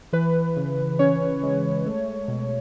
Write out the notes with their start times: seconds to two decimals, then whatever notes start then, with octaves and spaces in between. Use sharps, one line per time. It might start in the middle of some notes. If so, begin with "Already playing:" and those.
0.13 E3 B4
0.56 C#3
0.99 C#4 C#5
1.43 G#3
1.86 A3
2.28 B2